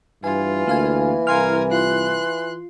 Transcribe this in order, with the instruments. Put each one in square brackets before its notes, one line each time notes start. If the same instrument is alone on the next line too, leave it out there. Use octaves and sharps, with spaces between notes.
[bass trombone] G2 [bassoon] E3 [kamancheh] F4 [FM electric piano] G#5
[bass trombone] D2 [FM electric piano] A#3 F5 G#5
[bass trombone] C2 [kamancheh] A#4 G#5 [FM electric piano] F5 C6 F6
[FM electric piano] F4 [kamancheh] C6 F#6